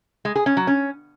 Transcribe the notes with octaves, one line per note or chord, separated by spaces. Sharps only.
G#3
G#4
C#4
F#3
C#4